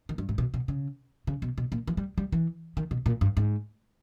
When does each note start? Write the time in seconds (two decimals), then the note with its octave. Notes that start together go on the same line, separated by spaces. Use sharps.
0.09 D#3
0.18 G2
0.29 G#2
0.38 B2
0.54 B2
0.68 C#3
1.27 C#3
1.42 B2
1.58 B2
1.72 A#2
1.87 E3
1.97 G3
2.18 G3
2.32 E3
2.77 D#3
2.91 B2
3.06 A#2
3.21 G2
3.37 G#2